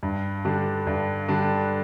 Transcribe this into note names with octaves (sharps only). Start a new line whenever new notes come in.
G2
D3 G3 D4
G2
D3 G3 D4